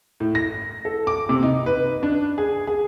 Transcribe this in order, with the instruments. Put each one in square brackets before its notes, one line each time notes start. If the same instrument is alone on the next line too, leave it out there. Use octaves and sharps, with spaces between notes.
[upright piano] A2
A#6
A4
D6
C3
D#4
B4
D4
G#4
G#4